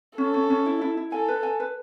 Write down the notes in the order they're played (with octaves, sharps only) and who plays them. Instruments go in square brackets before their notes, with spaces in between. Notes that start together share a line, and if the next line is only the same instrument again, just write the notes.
[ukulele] C#4 [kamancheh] A4
[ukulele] C#4
C#4
E4
E4
E4
[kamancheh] A4 [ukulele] G#5
[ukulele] B4
G#5
B4